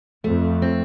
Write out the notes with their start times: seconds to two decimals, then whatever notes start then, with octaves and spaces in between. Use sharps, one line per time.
0.24 F2 A3
0.62 C4